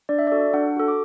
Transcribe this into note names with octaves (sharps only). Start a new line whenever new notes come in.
D4 D5
E5
F#4 A4 D5
D4 F#5
F#4 A4
D6